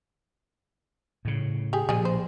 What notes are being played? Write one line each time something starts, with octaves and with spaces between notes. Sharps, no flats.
A2 C#3
G4 G#4
A#2 F3 G3 G#4
C5